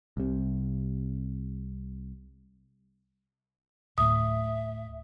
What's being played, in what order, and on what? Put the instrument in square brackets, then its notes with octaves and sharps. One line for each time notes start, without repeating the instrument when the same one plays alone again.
[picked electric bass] C2 C3
[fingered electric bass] D1 A2 [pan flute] E5 [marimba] D#6